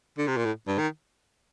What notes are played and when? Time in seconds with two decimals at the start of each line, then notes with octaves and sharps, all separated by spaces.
0.18 D3
0.28 C3
0.37 A#2
0.45 A2
0.67 G2
0.79 D#3